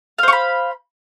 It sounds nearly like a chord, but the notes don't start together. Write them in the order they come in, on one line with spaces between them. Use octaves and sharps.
F5 C5 C#6 B5